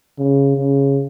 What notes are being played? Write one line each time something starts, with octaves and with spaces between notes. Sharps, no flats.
C#3
C#3